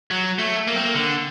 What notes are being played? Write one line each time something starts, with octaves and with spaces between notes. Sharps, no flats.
F#3
A3
A#3
C4
A#3
D3